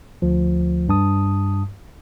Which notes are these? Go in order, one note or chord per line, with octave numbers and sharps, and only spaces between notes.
D2 F3
G2 A5 D#6